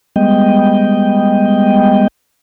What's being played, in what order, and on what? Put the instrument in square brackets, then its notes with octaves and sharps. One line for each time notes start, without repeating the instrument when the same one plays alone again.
[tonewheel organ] G3 G#3 B3 D#5 G5